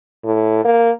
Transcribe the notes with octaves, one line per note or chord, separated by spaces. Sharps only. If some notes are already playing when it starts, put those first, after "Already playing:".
A2
A#3